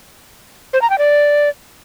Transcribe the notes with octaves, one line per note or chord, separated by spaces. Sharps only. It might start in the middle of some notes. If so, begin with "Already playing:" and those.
C5
A#5
G5
D5